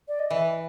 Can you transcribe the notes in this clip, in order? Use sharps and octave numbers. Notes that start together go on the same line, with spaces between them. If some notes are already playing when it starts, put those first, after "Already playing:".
D5
D#5
E3 E5